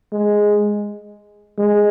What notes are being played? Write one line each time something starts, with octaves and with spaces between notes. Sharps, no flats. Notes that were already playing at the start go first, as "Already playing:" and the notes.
G#3
G#3